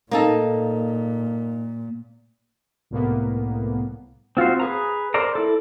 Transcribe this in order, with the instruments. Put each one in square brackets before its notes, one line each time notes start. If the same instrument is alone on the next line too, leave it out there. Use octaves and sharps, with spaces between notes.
[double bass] A#2 [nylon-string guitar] A#3 D#4 A4
[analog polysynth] C2 A2 A#3 B3
[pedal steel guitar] C4 F4 F#4 C5
G#4 B4 A#5
A#4 C5 D5 A#5
E4 A4